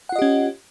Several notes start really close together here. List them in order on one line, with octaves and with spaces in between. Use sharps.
F#5 F4 D#5 G4 C#4